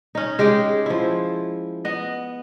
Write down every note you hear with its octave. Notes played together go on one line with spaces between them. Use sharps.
C#4 D#4
G#3 G4 G#4 G5
F3 E4
B3 D#5